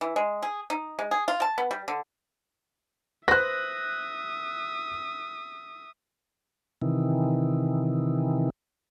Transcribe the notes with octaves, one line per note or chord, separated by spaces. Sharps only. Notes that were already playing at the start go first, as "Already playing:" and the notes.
E3
G#3
G#4
D#4
G#3
G#4
F4
A5
B3
G3
D3
B4 C5 E5 D#6 F#6 A#6
C3 D#3 E3